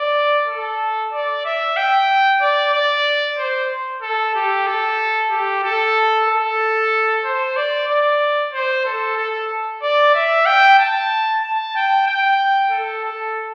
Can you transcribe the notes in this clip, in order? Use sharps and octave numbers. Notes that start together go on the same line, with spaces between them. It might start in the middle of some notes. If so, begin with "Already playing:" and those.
Already playing: D5
A4
D5
E5
G5
D5
D5
C5
A4
G4
A4
G4
A4
A4
C5
D5
D5
C5
A4
A4
D5
E5
G5
A5
A5
G5
G5
A4
A4